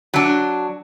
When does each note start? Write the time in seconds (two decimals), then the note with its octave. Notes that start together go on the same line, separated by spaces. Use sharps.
0.14 F#3 D4